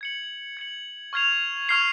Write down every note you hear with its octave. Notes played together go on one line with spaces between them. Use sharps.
G#6 C#7 F#7
G#6 C#7 F#7
C#6 F6 G#6 C7 F7
C#6 F6 G#6 C7 F7